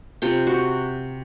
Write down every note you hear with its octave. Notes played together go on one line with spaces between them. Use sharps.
C3 F4 G5
F#4